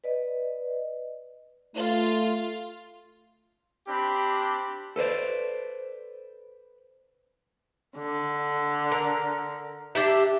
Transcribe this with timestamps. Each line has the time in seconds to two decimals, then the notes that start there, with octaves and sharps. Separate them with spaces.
0.04 B4 D5 D#5
1.76 A3 F4
3.88 C4 D4 G4 B5
4.96 A4 B4 C5 D5
7.97 D3
8.92 A#4
9.95 D4 G4 E5